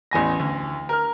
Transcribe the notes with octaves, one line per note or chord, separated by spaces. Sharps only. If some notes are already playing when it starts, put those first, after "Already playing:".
A1 E2 G#5 A#6
D2
A#4 F6